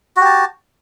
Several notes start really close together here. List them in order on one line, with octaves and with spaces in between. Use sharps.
F#4 G4 A5